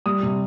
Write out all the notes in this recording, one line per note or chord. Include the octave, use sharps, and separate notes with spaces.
G3 D#6
C3